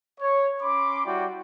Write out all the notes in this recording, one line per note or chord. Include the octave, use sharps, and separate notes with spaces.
C#5
C#4 B5 C6 D6
G3 E4 F#4 D5 G5